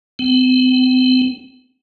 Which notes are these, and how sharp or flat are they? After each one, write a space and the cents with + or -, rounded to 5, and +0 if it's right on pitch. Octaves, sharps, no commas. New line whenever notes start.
C4 -40